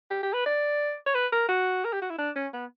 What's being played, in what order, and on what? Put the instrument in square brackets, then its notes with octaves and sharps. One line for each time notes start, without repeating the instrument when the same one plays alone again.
[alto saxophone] G4
G4
B4
D5
C#5
B4
A#4
F#4
A#4
G4
F#4
E4
D4
C#4
B3